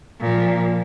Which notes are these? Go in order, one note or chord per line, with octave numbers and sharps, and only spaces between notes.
A#2 F3